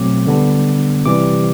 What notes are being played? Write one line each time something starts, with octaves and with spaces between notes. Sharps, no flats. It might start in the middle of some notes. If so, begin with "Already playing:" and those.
Already playing: B2 F#3 A3 C4 D6
D3 G3 B3 D4
C3 E3 G3 D6